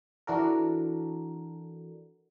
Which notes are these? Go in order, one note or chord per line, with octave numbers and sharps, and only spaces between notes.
E3 D4 F#4 A4 A#4